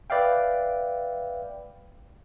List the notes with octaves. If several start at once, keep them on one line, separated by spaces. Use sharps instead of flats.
B4 D5 E5 F5 G5